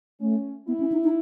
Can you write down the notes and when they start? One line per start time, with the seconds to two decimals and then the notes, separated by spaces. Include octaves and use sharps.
0.21 A3 C#4
0.68 B3 E4
0.80 C#4
0.92 D#4
1.04 D#4